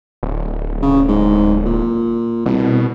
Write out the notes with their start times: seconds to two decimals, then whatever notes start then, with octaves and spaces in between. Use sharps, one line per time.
0.23 D1
0.82 C#3
1.09 G#2
1.65 A#2
2.46 C2 B2